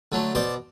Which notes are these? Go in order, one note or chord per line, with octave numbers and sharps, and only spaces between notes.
D3 F#3 A3
B2 C5 D5